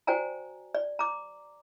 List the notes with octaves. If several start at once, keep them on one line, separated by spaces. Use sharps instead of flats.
F#4 C5 D5 G5 G#5 A#5
D5
A#5 D6